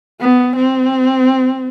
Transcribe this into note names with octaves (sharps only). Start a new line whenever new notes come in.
B3
C4